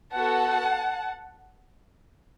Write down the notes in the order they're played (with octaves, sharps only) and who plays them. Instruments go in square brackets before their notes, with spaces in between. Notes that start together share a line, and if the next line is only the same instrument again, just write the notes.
[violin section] B3 F#4 A4 F#5 A5